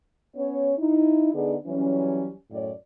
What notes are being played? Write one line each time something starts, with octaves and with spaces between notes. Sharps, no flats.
B3 C#4 C#5
D#4 E4
D3 B3 D#4 G#4 D5
E3 F#3 G3 C#4
F#2 A2 C#5 D5